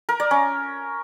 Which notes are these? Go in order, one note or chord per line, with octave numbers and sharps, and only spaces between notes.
A#4
D5
C#4